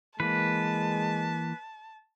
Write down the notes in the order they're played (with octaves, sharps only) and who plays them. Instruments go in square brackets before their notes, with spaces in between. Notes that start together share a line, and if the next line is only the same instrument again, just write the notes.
[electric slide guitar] E3 A#3 [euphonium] G#3 [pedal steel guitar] B4 [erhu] A5